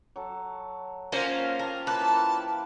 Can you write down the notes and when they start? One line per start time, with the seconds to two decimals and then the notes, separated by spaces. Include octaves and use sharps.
0.16 F#3 A4
1.12 A#3 C#4 F4 C5
1.59 G4 A#4 A5
1.87 E3 A#3 B4 A5
2.01 E3